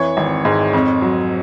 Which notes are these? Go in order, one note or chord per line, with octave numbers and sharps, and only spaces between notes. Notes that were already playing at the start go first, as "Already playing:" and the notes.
Already playing: F2 E3 C#5
G#1
G#2
F2
F#3